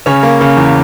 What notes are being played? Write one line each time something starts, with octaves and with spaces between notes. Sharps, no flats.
C#3 C#4 C#5
A#3
C#3
E2